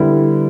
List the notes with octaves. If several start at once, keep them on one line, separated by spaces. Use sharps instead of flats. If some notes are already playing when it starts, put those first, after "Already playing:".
Already playing: D3 G3 B3 E4